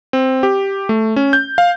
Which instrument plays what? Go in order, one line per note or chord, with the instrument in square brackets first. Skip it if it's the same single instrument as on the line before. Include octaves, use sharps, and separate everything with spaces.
[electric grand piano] C4
G4
A3
C#4
G6
F5